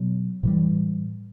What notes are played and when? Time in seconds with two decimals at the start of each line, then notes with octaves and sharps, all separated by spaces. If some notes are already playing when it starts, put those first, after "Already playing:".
Already playing: B2 F#3 B3
0.43 A2 E3 G3